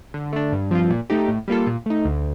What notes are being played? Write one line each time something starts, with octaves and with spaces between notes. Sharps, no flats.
D3
A3 D4
G2
F3 C4 F4
A#2
A3 D#4 G4
A2
G3 A#3 F4 A4
A#2
A3 D#4
D2